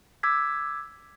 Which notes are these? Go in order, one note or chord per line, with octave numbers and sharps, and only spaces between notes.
D6 E6 G#6 B6